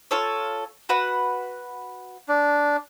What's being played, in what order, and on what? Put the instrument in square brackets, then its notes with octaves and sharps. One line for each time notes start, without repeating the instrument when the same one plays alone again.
[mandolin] F4 A4 C#5
F#4 B4 F#5
[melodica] D4